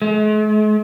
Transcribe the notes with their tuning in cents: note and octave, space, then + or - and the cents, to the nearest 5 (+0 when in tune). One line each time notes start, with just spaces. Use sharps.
G#3 +45